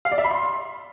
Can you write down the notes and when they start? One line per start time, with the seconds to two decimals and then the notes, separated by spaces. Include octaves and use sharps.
0.05 F5
0.12 D5
0.18 E5
0.24 B5
0.31 C6